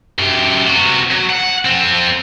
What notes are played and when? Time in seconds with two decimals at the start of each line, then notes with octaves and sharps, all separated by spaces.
0.19 F#2 G4
0.67 C3 F#4
1.10 F#3
1.30 F#5
1.65 F2 C4